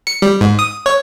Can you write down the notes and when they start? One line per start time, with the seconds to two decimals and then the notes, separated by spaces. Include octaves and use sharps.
0.07 C#7
0.22 G3
0.41 G#2
0.59 D#6
0.86 C#5